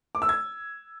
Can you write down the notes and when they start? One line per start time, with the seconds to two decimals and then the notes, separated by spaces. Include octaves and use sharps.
0.15 D6
0.22 E6
0.29 G#6